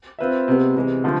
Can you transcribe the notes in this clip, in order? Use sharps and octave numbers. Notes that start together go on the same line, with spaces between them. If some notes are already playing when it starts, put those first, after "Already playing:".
C4 F4 B4 E5
C3 G#3 B3
C3 E3 G#3
D3 F3 A3